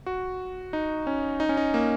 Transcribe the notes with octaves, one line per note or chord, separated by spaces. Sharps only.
F#4
D#4
C#4
D#4
C#4
D#4
A#3